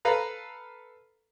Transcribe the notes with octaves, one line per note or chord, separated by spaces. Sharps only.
A4 B4 F5 A#5